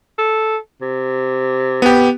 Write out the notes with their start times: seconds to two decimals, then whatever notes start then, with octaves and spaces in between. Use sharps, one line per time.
0.18 A4
0.81 C3
1.82 B3 G4